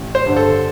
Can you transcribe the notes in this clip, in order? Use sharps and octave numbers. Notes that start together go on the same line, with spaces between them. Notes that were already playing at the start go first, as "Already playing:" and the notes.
Already playing: A1
C5
G2 D3
A4